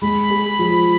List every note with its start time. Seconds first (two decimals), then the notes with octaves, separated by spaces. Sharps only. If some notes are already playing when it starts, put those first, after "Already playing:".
0.02 G#3 B5
0.30 G#4
0.59 F3